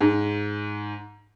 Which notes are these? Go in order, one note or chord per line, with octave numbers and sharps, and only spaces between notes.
G#2